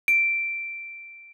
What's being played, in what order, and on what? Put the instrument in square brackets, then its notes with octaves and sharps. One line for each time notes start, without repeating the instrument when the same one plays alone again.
[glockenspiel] D7